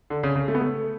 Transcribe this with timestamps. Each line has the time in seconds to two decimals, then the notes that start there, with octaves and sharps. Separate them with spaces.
0.10 D3
0.23 C#3
0.35 C#3
0.48 A3
0.55 B3
0.61 A3